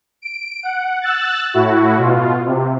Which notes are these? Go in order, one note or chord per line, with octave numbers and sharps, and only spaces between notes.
D7
F#5
E6 F#6 A6
A2 E4 F#4
B2 F4
C3